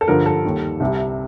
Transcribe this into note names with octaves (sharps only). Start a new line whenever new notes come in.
A4
G2 D3 F3 A#4
A4
D#2 D#3 G3
C2 C3 G3